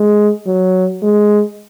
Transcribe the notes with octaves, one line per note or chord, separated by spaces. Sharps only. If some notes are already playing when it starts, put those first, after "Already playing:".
Already playing: G#3
F#3
G#3